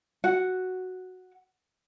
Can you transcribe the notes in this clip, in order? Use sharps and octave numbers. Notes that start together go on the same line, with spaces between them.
F#4 F#5